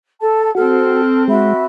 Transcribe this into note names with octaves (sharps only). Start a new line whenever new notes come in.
A4 A5
C4 F#4 A4 F6
G#3 F#4 E5 B5